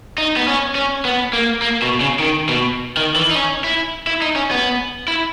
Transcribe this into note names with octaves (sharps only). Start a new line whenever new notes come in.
D#4
B3
C#4
C#4
B3
A#3
A#3
B2
C#3
D#3
B2
D#3
E3
D#4
C#4
E4
E4
D#4
C#4
B3
E4